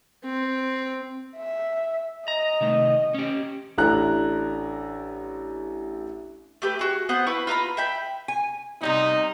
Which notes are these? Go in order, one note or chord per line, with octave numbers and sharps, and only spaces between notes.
C4
E5
D#5 A#5
C3 D#3 A3
C#4 G4
A1 A3 D4 E4 A#5 F#6
A3 G4 B4
F#4 G#4
B3 C5 F#5 F#6
E4 B4 B5 C#6
F4 B4 A#5 B5
E5 G5 B5
G#5
C3 G3 B3 D#4